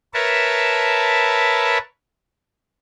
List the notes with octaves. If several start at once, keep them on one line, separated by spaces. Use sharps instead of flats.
A#4 B4 C#5 E5 A5